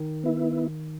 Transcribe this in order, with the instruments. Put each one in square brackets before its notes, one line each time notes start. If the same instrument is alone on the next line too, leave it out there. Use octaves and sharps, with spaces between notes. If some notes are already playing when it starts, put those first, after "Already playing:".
Already playing: [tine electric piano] D#3
[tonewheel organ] B3 E4